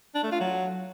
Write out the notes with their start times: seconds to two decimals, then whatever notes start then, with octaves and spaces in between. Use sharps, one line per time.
0.15 D4
0.23 A3
0.32 F4
0.40 F#3